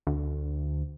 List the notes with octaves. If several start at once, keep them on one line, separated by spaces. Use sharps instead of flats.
D2